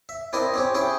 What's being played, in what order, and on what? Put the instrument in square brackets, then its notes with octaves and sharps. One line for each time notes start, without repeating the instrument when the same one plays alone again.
[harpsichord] E5
C4 D4 E4 A#4 D#5
C4 C#4 G4
C#4 E4 G#4 G5